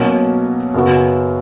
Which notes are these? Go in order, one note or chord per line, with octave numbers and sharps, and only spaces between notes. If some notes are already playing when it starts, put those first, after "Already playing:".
Already playing: B2 F#3 A#3 C#4
F#2 C#3 F#3 B3 F#4